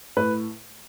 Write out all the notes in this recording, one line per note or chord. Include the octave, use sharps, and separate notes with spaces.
A2 B4